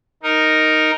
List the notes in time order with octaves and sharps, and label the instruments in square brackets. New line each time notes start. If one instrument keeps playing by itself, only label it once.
[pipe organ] D#4 A#4